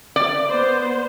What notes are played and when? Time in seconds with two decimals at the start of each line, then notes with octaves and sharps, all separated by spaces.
0.16 D5
0.49 B3 C5